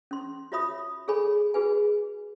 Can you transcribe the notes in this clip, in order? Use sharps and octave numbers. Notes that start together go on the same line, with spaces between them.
C#4 C6
F4 F#4 C#5 E5 B5 D#6
G#4 A4 C#5 G#5 B5
F#4 G#4 B4 G#5